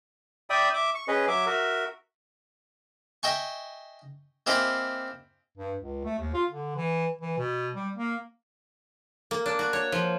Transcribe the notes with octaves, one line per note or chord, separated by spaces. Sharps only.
D5 E5 G5 B5 D#6
E5 D6
C#6
C#4 G#4 B4 D#5
F#3 E5 D6
F#4 A#4 E5
D#5 E5 G5 G#5 C#6
A#3 C4 E4 G4 D#5 G#5
G2
C#2
A3
D#2
F4
D3
E3
E3
B2
G3
A#3
A#3
D4
F#4
C#5
F3